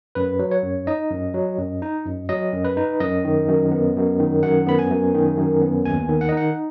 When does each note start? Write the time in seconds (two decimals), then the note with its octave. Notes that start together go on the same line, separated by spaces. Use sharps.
0.15 F#2 B4
0.39 F#3
0.51 C#5
0.63 F#2
0.87 D#4 D#5
1.11 F#2
1.34 F#3
1.58 F#2
1.82 D#4
2.05 F#2
2.29 F#3 D#5
2.53 F#2
2.65 B4
2.77 D#4
3.00 F#2 D#5
3.24 D#3
3.48 F#2
3.71 B3
3.96 F#2
4.19 D#3
4.43 F#2 F#5
4.67 B3 B5
4.79 G#5
4.91 F#2
5.15 D#3
5.38 F#2
5.62 B3
5.85 D#2 G#5
6.09 D#3
6.21 F#5
6.29 D#5
6.32 D#4 F#5